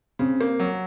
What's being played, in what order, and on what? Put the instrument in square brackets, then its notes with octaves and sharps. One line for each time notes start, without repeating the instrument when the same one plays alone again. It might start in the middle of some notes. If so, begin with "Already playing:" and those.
[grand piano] C#3 [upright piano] C4
[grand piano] A#3
F#3